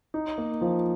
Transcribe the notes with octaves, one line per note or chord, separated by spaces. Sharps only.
D#4
A#3
F3